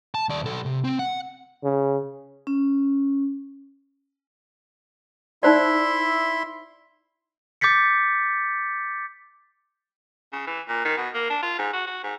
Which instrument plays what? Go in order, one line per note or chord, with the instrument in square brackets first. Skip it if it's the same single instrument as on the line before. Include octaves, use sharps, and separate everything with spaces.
[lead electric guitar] A5
D#2 D5
B1 A4
C3
C4
F#5
[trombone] C#3
[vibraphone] C#4
[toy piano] D#4 C5 D5 [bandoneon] E4 E5 C6
[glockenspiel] D6 G6 A6 B6 C#7
[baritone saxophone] C#3
E3
A#2
D#3
B2
A#3
D4
F4
G#2
F#4
F#4
G#2